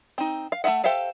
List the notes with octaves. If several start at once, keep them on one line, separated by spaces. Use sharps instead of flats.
C4 D#4
F5
A3 F#4 A4 E5 F#5
G4 A4 C5 E5 F5